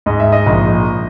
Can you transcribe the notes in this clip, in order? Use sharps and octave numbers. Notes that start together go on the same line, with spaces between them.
G#2 D#5
E5
D#5
A#1